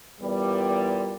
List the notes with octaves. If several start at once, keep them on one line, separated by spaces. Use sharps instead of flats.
E2 A#2 G3